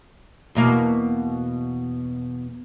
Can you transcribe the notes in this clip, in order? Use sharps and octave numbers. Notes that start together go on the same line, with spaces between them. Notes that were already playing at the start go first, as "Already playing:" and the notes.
E2 B2 A#3